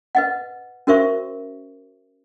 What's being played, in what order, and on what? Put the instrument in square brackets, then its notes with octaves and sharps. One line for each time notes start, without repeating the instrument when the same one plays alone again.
[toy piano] B4 D#5 F#5
C#4 F#4 A#4 C5 E5 C#6